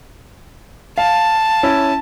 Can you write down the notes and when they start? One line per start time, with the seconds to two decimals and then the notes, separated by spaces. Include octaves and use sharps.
0.98 F5 A5
1.63 C#4 E4